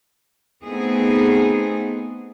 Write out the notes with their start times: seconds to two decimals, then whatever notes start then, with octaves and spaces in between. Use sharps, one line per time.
0.64 A3 B3 C4 D#4 G#4